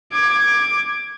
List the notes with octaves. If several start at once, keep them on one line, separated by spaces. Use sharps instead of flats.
D6 G#6